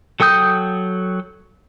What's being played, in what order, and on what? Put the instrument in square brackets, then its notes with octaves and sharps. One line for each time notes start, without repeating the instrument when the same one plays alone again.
[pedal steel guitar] F#3 A4 G5 D#6 G6